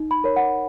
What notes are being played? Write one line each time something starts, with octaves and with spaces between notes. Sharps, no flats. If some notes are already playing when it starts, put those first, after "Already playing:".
Already playing: D#4
B5
A#4 C#5
F#5